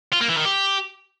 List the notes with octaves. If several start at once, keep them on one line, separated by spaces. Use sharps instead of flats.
F4
A#3
E3
D#3
G4